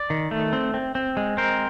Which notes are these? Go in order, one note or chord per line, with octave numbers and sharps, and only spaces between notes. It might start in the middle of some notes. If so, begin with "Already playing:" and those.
Already playing: D5
D#3
A3
C4
C4
C4
G#3
C4 A#4 C5